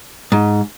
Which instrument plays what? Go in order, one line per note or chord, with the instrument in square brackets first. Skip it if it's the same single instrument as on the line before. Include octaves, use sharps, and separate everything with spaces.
[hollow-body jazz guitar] G#2